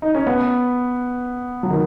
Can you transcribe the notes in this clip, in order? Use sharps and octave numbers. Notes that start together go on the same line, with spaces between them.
D#4
C#4
B3
F#3
D#3